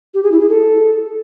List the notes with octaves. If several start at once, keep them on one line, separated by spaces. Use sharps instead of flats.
G4
G#4
E4
G#4
A4